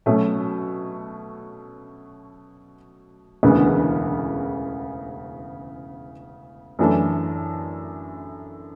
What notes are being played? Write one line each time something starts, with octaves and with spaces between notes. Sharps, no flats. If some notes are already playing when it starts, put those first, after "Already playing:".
B2 F#3 A3 C#4
E1 D2 C#3 E3 B3
F#2 E3 A3 D4 A4